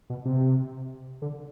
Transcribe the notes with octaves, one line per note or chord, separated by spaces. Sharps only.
B2
C3
D3